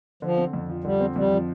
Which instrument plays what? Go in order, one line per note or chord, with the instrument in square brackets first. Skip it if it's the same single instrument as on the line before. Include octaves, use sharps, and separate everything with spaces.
[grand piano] D3 [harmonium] F3
[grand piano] C4
F2
F3
[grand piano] D3 [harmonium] G3
[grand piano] C4
[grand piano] F2 [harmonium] G3
[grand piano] F3